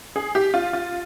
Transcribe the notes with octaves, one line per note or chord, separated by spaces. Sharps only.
G#4
G4
F4
F4